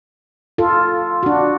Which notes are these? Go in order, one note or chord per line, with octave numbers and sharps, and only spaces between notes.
F4 A4
D4 F#4